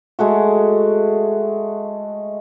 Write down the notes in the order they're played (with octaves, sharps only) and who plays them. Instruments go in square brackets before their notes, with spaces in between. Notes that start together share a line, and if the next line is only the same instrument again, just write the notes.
[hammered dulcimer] G#3 A3 F#4